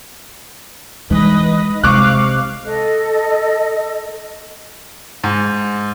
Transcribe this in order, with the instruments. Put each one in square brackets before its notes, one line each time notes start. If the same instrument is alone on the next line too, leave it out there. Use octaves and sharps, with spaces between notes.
[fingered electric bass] E3 [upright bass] G#3 D#4 [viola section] B4 D#5
[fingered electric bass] C3 [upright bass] G#3 [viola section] F5 [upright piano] C#6 D6 F#6
[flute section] A4 D#5
[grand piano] G#2